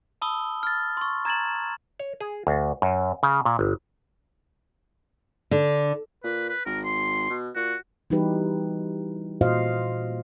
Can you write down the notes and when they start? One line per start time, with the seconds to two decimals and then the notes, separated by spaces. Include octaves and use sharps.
0.22 A5 B5 D#6 E6 G7
0.63 F6 A6
0.97 C6 C#6
1.25 A#5 G#6 A6 E7 F#7
2.00 C#5
2.21 G#4
2.47 D2
2.82 F#2
3.23 C#3
3.45 A#2
3.59 G1
5.51 D3
6.24 A#2 B4
6.49 B4
6.66 G#1 A#4
6.85 C6
7.30 B2
7.56 A#2 F#4
8.10 E3 G3 D#4 F#4 G4 B4
9.41 A#2 F4 F#4 C5 D#5 F5